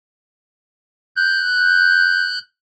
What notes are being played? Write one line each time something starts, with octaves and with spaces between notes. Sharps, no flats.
F#6 G6